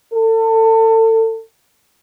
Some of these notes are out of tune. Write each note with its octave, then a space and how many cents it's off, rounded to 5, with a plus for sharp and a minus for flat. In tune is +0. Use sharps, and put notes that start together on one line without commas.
A4 +30